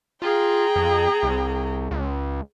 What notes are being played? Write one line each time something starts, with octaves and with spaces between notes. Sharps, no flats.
F4 G#4 G5 A#5
F2
C2
C#2